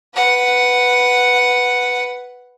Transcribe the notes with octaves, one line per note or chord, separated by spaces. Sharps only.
B4 F#5